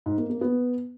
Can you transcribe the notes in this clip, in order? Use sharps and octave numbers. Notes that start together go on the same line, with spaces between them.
G#2
A#3
A#3
B3